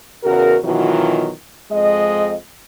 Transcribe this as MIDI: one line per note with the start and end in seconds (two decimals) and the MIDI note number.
0.24 0.57 40
0.24 0.57 49
0.24 0.57 66
0.24 0.57 70
0.64 1.30 47
0.64 1.30 51
0.64 1.30 52
0.64 1.30 54
0.64 1.30 65
1.71 2.34 41
1.71 2.34 56
1.71 2.34 75